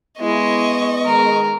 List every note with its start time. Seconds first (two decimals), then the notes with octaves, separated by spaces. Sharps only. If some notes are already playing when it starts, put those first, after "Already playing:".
0.21 G#3 B3 E4 D#5 C#6
1.05 D#3 G#3 A#4